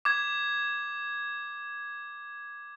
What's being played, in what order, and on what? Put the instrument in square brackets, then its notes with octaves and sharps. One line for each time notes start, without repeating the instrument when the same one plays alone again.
[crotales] D6 G#6